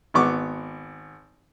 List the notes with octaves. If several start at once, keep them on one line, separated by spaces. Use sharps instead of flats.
G#1 B3 C#6 D6